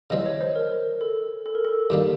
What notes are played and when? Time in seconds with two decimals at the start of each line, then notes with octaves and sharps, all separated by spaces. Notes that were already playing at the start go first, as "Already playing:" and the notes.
0.10 C#3 E3 G3 C4 D#5
0.26 C#5
0.41 C5
0.56 A#4
1.01 A4
1.46 A4
1.55 A#4
1.65 A4
1.90 G2 D#3 G3 A#3 G4